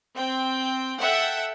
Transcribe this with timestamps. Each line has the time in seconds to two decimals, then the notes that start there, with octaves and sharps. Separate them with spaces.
0.16 C4 G5
0.99 A4 E5 F#5 G5